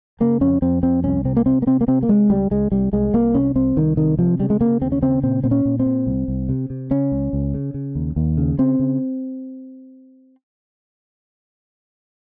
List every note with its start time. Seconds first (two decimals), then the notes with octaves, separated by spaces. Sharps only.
0.20 C#3 A#3
0.41 F2 C#4
0.62 F2 C4
0.83 F2 C4
1.04 C2 C#4
1.25 C3 C4
1.37 A#3
1.46 C3 C4
1.62 A#3
1.67 C3 C4
1.81 A#3
1.88 C3 C4
2.03 A#3
2.08 C3 G#3
2.29 C#2 G3
2.51 C#2 G#3
2.72 C2 G3
2.92 C2 G#3
3.14 C2 A#3
3.34 C3 C#4
3.55 C2 C4
3.76 C2 D#3
3.97 C3 D#3
4.18 C3 F3
4.39 C#3 G3
4.50 G#3
4.60 C#3 A#3
4.81 D#2 C4
4.92 C#4
5.02 C#3 C4
5.23 A#2 C4
5.44 A#2 C4
5.51 C#4
5.65 A#2
5.80 C4
5.86 A#2
6.07 C2
6.28 C2
6.49 C3
6.70 C3
6.91 C#3 C#4
7.12 C#2
7.33 C#2
7.54 C#3
7.74 C#3
7.95 D#2
8.16 D#2
8.37 C#3
8.58 C#3 C4
8.79 C#3